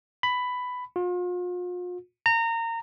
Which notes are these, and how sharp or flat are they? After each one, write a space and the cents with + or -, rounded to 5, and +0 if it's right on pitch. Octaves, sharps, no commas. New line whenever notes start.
B5 +10
F4 +40
A#5 -25